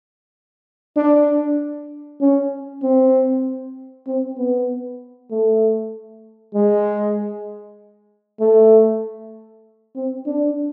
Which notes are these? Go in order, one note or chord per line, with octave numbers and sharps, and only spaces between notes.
D4
C#4
C4
C4
B3
A3
G#3
A3
C4
D4